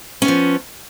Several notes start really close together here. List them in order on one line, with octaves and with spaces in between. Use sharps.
C#4 B3 F3